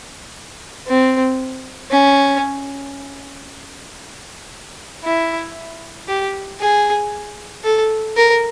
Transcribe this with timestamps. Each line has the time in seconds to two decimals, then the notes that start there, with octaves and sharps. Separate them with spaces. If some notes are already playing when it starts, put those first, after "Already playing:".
0.87 C4
1.91 C#4
5.04 E4
6.08 G4
6.60 G#4
7.64 A4
8.16 A#4